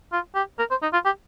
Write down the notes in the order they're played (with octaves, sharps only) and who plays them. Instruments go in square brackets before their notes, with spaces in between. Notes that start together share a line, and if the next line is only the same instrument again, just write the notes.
[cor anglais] F4
G4
A#4
C5
D#4
F4
G4